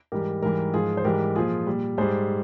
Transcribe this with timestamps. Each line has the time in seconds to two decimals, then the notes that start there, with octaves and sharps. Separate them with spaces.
0.12 G#2 E3 G3 G4 A#4
0.42 G#2 E3 G3 G4 A#4
0.74 G#2 F3 F4 G#4
0.97 C5
1.05 G#2 E3 G3 G4 A#4
1.36 A#2 F3 F4 G#4
1.67 A#2 G3
1.98 G#2 G3 G#4 C5